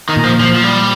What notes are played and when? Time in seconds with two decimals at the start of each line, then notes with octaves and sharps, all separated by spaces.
0.09 D#3
0.17 A#2
0.25 F3
0.40 F3
0.56 F3
0.64 G3